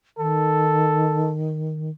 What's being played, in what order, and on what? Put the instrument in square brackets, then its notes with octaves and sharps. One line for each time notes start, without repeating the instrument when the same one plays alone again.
[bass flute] D#3 [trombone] A4